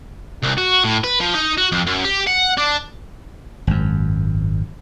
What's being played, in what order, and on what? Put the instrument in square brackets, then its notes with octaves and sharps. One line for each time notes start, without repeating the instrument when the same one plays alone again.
[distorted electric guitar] C2
F#4
A2
B4
F3
D#4
F#4
F2
F#2
G4
F#5
D4
[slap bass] G#1 F#2